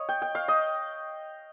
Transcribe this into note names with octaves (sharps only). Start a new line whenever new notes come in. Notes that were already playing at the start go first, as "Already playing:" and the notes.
Already playing: C#5 D#5 F5
G5
G5
F5
D#5